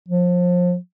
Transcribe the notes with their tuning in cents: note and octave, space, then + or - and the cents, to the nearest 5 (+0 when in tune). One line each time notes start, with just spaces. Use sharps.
F3 +30